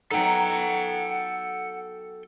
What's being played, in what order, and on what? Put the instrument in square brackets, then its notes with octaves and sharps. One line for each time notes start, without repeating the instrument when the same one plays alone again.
[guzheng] F#3 B3 D#4 [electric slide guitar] A4 G5 [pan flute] F#5